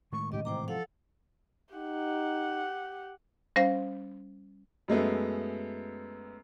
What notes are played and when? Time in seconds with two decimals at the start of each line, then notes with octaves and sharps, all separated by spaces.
0.12 A2 D#3 G#3 C#6
0.32 D1 G#2 C#3 G4 D#5
0.45 G#2 C3 E3 C5 G5 A#5 D6
0.68 F3 A4 F5 F#5
1.75 D#4 G4 F#5
3.56 G3 C#4 C5 F5 A#6
4.88 F#2 G#3 A3 B3